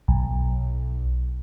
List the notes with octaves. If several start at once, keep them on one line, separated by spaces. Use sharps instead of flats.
B1